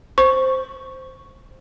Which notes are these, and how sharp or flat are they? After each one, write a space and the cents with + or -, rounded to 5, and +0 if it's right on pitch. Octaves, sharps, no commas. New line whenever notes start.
C5 +0 C#6 +0